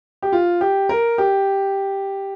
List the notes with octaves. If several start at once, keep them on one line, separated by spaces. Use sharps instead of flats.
G4
F4
G4
A#4
G4